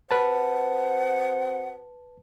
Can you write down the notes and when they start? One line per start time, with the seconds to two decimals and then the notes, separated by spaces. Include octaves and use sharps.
0.11 C4 F#4 B4 C5 F#5 A5